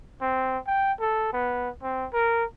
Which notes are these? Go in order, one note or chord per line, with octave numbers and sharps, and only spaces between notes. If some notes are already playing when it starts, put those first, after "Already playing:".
C4
G5
A4
B3
C4
A#4